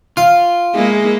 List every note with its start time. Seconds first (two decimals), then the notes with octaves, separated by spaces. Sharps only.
0.17 F4 F5
0.74 G#3 A#3 E4 G#4